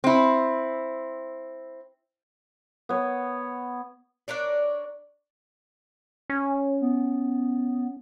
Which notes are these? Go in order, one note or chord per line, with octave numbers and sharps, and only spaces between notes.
C4 E4
B3 C#5
D4 A#4 C#5 D5
C#4
B3